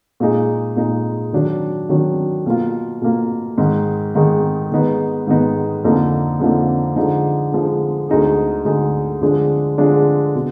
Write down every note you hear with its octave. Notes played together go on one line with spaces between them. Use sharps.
A#2 G#3 D#4 G#4
A#2 G#3 D#4 G#4
D#3 F#3 D4
D#3 F#3 D4
B2 A#3 F4
B2 A#3 F4
G#2 D#3 G#3 D#4 G#4
G#2 D#3 G#3 D#4 G#4
G#2 D#3 G#3 B3 D#4
G#2 D#3 G#3 B3 D#4
F2 D3 F3 A#3 D#4
F2 D3 F3 A#3 D#4
D3 F3 G#3 D#4
D3 F3 G#3 D#4
D2 D3 G#3 D#4 G#4
D2 D3 G#3 D#4 G#4
D3 F3 G#3 D4 G#4
D3 F3 G#3 D4 G#4
B2